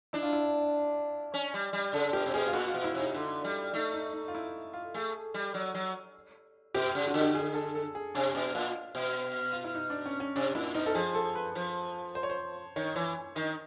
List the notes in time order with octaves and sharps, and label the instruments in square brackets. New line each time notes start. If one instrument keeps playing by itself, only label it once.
[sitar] D4 [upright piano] E4
[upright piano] F4
E4
[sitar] C#4
G3
G3
[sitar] C#3 [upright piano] A4
[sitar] B2 [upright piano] G4
[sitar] C3
[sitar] B2 [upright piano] G#4
[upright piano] F4
[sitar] A#2 [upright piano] F#4
[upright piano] F4
[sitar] B2
[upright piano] E4
[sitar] C3 [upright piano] D#4
[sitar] D3
G3
[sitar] A3 [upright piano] D#4
[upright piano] D#4
D#4
F4
E4
F4
[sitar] A3 [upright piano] G#4
[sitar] G3
F#3
F#3
[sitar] B2 [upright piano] G4
[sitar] C#3
[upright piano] F#4
[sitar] D3
[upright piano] G4
G#4
A4
A4
G#4
[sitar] C3 [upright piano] D4
[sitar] B2 [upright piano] D4
[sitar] A#2 [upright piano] F4
[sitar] B2
[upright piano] F4
E4
D#4
D4
C#4
C#4
[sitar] C3 [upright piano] D4
[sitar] A#2 [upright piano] E4
[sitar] B2 [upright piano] D#4
[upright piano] A4
[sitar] F3 [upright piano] G#4
[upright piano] A4
B4
[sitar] F3
[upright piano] C5
C#5
C5
[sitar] D#3 [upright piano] C#5
[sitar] E3 [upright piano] C#5
[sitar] D#3 [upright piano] D#5